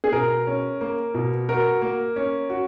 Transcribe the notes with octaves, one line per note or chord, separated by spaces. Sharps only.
G#4
B2 A#4
C#4
A#3
B2
F#4 A#4
A#3
C#4
F#4